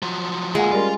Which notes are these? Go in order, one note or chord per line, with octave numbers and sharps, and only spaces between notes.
F3 F#3
D2 G#3 A#3 F4 F#5 G#5
G3 C#4 F4 A#4